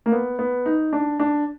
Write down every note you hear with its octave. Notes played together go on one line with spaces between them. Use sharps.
A#3
B3
B3
D#4
D4
D4